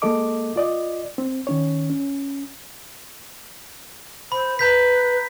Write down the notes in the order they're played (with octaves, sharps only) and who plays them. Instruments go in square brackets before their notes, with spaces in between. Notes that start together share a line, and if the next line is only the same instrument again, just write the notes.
[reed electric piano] G#3 A#3 A4 D#5 D6
F4 D5 D#5
C4
D#3 C#4 C#5
C#4
[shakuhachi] C5 [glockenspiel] B5
[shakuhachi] B4 [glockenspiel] A#5 G6 B6